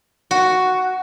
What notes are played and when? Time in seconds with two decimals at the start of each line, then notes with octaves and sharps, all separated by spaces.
0.31 F#4